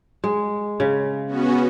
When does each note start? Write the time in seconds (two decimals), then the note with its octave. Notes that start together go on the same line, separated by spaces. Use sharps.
0.24 G#3
0.80 C#3
1.27 B3 C#4 F#4